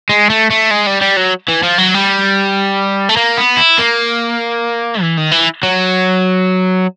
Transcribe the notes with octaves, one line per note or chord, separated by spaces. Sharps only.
G#3
A3
A3
G#3
G3
G3
F#3
E3
F3
F#3
G3
A3
A#3
B3
E4
A#3
E3
D#3
E3
F#3